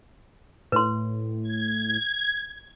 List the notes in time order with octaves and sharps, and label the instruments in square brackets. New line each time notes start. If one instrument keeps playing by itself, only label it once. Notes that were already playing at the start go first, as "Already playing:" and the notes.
[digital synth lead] A2 [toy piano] B4 C6
[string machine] G#6